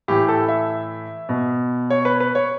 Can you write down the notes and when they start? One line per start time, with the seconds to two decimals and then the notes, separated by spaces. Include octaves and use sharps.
0.08 A2 E3 G4
0.28 A4
0.49 E5
1.29 B2
1.90 C#5
2.05 B4
2.20 B4
2.35 C#5